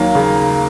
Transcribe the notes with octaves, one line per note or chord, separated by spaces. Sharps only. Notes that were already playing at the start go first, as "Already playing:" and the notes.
Already playing: D#2 F#3 A#3
C#3